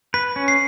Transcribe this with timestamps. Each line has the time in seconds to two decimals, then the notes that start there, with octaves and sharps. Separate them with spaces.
0.14 B4 B6
0.36 C#4
0.48 C7